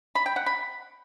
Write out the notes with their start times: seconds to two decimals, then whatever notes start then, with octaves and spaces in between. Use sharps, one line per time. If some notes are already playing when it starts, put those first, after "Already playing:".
0.15 B5
0.26 G5
0.36 F#5
0.46 B5